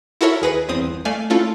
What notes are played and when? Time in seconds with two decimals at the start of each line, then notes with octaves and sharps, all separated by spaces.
0.21 E4 F#4 A4 A#4 C#5 E5
0.42 D#2 G#4 B4 A#6
0.68 G1 E2 C4 D#6
1.05 A3 D5 F5 G#5
1.30 A3 C#4 E4 F4 A4